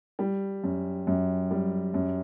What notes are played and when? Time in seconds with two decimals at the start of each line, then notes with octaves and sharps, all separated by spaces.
0.19 G3
0.64 F#2
1.07 F#2
1.51 G3
1.94 F#2